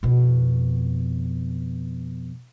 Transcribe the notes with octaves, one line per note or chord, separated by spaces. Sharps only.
F2 B2